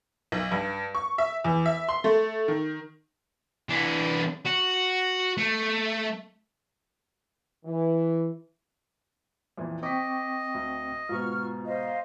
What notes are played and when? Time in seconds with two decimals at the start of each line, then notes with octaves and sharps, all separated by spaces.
0.32 B1
0.52 G2
0.95 C#6
1.18 E5
1.44 E2
1.66 E5
1.89 C6
2.04 A3
2.48 D#3
3.69 E3 D4
4.46 F#4
5.37 A3
7.65 E3
9.58 F2 A#2 E3
9.83 C4 D#5 G5 C#6 D6 B6
10.54 D2
11.09 G#2 B2 F4 C#6 F6
11.65 C5 D#5 F5